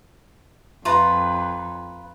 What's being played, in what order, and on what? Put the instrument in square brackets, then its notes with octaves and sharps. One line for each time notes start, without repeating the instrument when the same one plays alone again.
[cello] F2 [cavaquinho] F4 B4 A#5